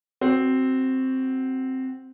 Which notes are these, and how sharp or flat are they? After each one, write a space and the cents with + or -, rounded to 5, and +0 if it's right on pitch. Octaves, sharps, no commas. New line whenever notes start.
C4 +0 F#4 +15